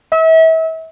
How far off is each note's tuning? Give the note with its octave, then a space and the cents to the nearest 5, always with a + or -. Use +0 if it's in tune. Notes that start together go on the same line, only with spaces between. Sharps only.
E5 -35